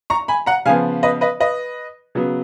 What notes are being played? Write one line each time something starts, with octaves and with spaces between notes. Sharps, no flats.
A#5 C#6
G#5 B5
F#5 A#5
C#3 F3 B3 F5 G#5
B4 D#5
B4 D#5
B4 D#5
C#3 F#3 B3